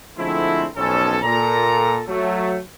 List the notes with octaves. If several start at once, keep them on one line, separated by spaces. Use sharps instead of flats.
D3 F3 G#3 A3 C4 E4
B1 F2 C#4 A4
A#2 A4 A#5
F#3 A3